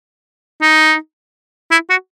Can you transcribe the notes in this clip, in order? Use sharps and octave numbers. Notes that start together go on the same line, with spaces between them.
D#4
E4
F#4